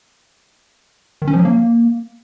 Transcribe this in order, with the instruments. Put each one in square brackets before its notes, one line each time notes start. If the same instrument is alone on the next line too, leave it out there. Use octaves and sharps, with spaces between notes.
[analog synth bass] D#3
C#4
F3
F#3
A#3